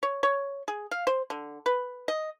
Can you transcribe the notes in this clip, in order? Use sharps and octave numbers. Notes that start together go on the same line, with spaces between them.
C#5
C#5
G#4
F5
C5
D3
B4
D#5